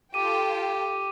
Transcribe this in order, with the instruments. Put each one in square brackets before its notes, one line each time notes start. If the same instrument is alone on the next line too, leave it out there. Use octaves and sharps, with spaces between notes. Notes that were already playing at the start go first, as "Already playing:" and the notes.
[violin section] F4 A4 G5 [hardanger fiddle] G4 [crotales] D6 D#7